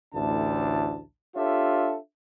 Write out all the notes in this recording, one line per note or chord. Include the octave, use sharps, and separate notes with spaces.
A1 D2 A2 D4 E4 A5
D4 F4 G4 A4 C#5 E5